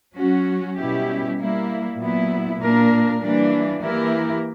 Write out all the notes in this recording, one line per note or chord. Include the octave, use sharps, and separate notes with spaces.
F#3 C#4 F#4
B2 G3 C#4 E4 G4
G3 A#3 E4
A#2 F#3 B3 E4
A#2 A#3 D4 A#4
E3 G3 A#3 D4
E3 A#3 E4 G4 A#4